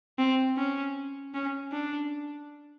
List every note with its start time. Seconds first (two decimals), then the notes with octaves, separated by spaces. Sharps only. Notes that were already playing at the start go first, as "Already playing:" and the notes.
0.18 C4
0.57 C#4
1.34 C#4
1.72 D4